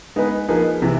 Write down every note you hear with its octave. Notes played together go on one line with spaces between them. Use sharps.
G#3 B3 D#4 G#4 B4
F3 A#3 D#4 G#4 B4
C3 E3